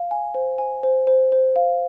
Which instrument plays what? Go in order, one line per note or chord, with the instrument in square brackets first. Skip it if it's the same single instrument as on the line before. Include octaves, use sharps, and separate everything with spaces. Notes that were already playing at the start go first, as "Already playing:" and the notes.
Already playing: [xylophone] F5
G#5
C5
G#5
C5
C5
C5
F5